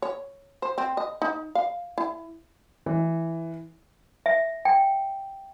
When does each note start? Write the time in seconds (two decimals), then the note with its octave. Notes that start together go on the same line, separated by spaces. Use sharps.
0.02 C#5
0.62 C5
0.78 C4
0.97 D#5
1.22 D#4
1.55 F5
1.98 E4
2.86 E3
4.26 E5
4.65 G5